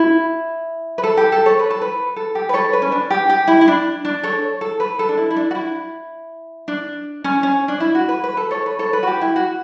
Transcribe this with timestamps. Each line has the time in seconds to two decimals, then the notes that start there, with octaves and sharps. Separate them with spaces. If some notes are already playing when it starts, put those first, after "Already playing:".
Already playing: E4
0.98 B4
1.03 A4
1.17 G4
1.32 A4
1.46 A4 C#5
1.59 B4
1.70 A4
1.81 B4
2.16 A4
2.35 G4
2.49 B4
2.54 A4 C#5
2.73 B4
2.82 C#4
2.92 D4
3.10 G4
3.30 G4
3.48 E4
3.61 E4
3.68 D4
4.05 D4
4.23 A4 C#5
4.61 A4
4.80 B4
4.99 A4
5.09 D4
5.17 E4
5.31 E4
5.36 D4
5.51 F#4
5.55 E4
6.68 D4
7.24 C#4
7.43 C#4
7.68 D4
7.80 E4
7.95 F#4
8.09 B4
8.24 B4
8.37 A4
8.51 A4 C#5
8.66 B4
8.79 A4 C#5
8.93 B4
9.03 F#4
9.07 G4
9.21 E4
9.36 F#4